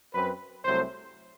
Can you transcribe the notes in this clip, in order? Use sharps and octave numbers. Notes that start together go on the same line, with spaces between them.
F#2 F#3 C4 B4
C2 C3 F#3 A3 C5